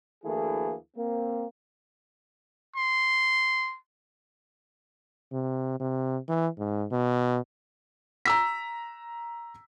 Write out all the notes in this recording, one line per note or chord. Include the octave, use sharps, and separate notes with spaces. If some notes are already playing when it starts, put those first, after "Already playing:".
D2 E3 A3 A#3 E4 G#4
A#3 C4
C6
C3
C3
E3
G#2
B2
A#5 E6 B6